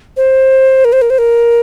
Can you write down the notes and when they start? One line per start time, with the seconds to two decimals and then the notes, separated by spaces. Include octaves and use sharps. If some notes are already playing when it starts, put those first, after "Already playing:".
0.17 C5
0.85 A#4
0.93 C5
1.02 A#4
1.10 C5
1.18 A#4